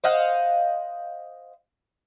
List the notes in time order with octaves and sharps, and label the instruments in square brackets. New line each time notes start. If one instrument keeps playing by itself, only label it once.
[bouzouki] C5 D#5 F5 F#5